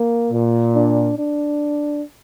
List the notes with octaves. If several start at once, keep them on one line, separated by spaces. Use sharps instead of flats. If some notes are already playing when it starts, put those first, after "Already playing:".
Already playing: A#3
A#2
D4
D4